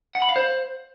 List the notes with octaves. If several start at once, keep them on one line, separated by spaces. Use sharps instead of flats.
F#5
B5
F5
C5